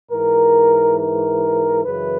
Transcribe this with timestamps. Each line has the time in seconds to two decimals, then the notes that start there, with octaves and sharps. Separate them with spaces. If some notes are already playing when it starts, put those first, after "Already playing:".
0.11 G#2 E3 A#4
0.98 A#4
1.85 F#2 C#3 E3 B4